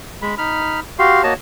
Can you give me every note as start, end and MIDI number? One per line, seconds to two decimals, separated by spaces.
0.22 0.35 56
0.22 0.35 83
0.38 0.80 63
0.38 0.80 83
0.38 0.80 89
0.99 1.23 66
0.99 1.23 67
0.99 1.23 77
0.99 1.23 84
1.24 1.34 58
1.24 1.34 66
1.24 1.34 73
1.24 1.34 75
1.24 1.34 81